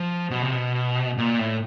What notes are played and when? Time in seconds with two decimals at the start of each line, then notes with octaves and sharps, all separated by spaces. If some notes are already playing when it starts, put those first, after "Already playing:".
Already playing: F3
0.30 B2
0.43 C3
0.53 B2
1.18 A#2
1.39 A2